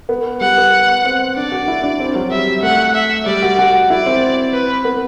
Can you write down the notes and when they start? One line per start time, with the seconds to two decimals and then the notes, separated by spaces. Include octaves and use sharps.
0.09 B3
0.41 G3 F#5
0.57 B3
1.05 C4
1.36 D4 D5
1.52 F#4
1.68 E4
1.83 D4
2.00 C4
2.15 F#3
2.31 G3 E5
2.63 A3 F#5
2.95 E5
3.26 G3 D5
3.43 F#4
3.59 F#4
3.90 E4 D5
4.06 C4
4.53 B4
4.85 B3